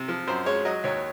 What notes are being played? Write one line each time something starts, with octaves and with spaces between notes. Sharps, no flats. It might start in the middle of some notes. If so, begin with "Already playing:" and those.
Already playing: C3
F3
F#2 C5
G#3 C#5
F#3 D#5
D#2 C#5